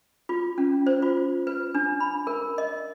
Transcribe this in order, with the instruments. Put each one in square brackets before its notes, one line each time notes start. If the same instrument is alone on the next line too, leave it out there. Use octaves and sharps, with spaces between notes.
[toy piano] F4
C#4
C5
F4
B4
D4
B5
A#4
D#5